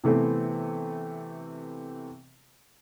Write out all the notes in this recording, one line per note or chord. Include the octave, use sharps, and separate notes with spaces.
C3 E3 A3 B3 C4